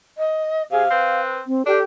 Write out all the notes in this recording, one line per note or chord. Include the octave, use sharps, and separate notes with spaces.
D#5
C3 G#4 F5
C4 B4
C4
D4 G4 A4